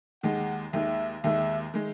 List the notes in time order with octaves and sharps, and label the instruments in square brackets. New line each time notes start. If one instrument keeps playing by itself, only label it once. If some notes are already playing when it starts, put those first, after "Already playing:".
[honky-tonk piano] D#2 D#3 G#3 [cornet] F#5
[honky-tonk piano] D#2 D#3 G#3 [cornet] E5
[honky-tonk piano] D#2 D#3 G#3 [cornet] E5
[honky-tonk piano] D#3 G#3